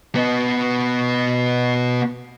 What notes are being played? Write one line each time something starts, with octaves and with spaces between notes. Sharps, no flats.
B2 B3